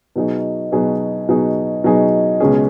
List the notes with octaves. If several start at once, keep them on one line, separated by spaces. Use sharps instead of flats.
B2 F#3 D#4 G#4
B2 F#3 D#4 G#4
B2 F#3 D#4 G#4
B2 F#3 D#4 G#4
C#2 B2 G#3 C#4 G#4